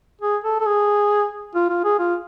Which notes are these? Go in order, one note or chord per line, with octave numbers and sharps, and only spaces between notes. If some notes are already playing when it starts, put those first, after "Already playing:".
G#4
A4
A4
G#4
F4
F4
G#4
F4